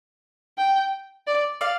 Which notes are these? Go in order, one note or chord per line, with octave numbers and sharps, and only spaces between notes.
G5
D5
D5 F5